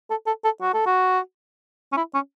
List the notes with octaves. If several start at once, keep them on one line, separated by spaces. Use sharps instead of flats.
A4
A4
A4
F#4
A4
F#4
C#4
E4
C#4